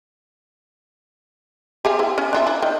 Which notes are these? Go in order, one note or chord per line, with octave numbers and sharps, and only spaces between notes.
G4 G#4 F5
C4 E4
C#4
D4 F4 E5
E4
D#3